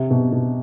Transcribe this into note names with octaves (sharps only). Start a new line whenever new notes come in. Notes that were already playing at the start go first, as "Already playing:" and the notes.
Already playing: C3
B2
B2